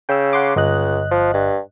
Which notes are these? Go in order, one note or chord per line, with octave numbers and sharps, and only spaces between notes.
C#3 G5 E6
F#5 C6 D6
G1 C#2 D#5 F#6
F3
G2